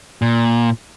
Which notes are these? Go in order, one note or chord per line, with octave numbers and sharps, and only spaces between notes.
A#2